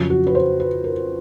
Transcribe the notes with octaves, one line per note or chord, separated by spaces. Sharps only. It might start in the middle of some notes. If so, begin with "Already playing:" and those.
Already playing: F2 C#3 F#3
F#4
B4
C5
B4
A#4